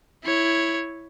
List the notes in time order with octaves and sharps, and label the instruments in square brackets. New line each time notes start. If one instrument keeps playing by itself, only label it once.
[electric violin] E4 C#5